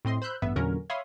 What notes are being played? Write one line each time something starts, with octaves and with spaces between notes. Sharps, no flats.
A2 C4 D#5 C6
C5 B5 E6 F#6 G6
A1 G2 B3 E5
E2 A#2 D3 F#3 C#4 A#4
C#5 E5 F5 B5 C6 D#6